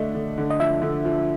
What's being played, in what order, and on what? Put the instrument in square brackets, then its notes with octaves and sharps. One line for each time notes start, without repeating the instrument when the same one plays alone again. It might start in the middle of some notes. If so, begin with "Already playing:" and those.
Already playing: [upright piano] D3 A3 D4 [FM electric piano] D#5
[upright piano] D3
D3
[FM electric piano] D#5
[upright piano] F3 [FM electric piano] E5
[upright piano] D3
F3